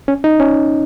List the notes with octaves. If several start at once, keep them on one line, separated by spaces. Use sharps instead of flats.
C#4
D#4
C#4